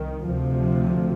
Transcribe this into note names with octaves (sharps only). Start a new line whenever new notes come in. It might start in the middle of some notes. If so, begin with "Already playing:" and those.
Already playing: C2 D#3
D2 C3 F3